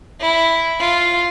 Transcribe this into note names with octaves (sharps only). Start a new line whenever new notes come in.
E4
F4